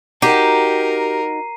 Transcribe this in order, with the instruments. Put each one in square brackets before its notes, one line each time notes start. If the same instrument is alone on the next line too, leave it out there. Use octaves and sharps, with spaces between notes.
[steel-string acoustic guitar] D#4 F#4 [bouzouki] G4 [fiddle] A#4 [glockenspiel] A#5 C7 D#7